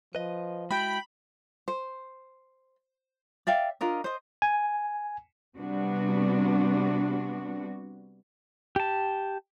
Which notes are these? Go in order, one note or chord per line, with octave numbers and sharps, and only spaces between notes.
F3 B4 D#5
G#3 E4 F#4 G5 B5
C5
D5 E5 F5 G5
D4 F4 A#4 D#5
C5 D#5
G#5
C3 G3 B3 D4 F#4
G4 A5